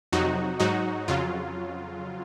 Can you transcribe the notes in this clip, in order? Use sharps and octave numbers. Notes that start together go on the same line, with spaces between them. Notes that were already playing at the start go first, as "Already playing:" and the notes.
F2 C3 F#3 D#4 F#4
G#2 F#3 D#4 F#4
F2 C#3 F#3 F4